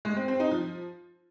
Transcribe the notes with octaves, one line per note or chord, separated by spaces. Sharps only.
G#3
C4
C4
D#4
F3